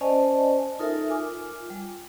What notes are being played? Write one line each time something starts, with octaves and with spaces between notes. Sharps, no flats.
C#4 C5 D5 D#5 G#5 A5
D#4 F4 A4 A#4 E5
F4 G#5 D6
G3